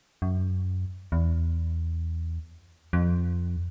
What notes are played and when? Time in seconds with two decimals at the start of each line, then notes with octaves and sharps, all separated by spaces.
0.22 F#2
1.12 E2
2.93 F2